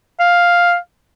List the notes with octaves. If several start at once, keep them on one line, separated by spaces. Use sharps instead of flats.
F5